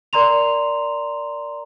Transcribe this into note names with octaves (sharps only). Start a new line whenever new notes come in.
A#4 D5 A#5 C6 F7